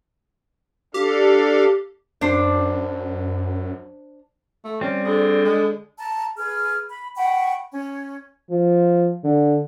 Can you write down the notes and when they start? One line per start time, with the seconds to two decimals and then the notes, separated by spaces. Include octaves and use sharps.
0.94 D4 G4 A4 F5
2.21 F#2 D4 C5
4.64 A3
4.81 G3 C4 C#4
5.04 D3 G#4
5.44 G#3
6.00 A5 A#5
6.37 G#4 B4 F6
6.90 B5
7.16 F#5 G5 B5 C#6
7.71 C#4
8.50 F3
9.24 D3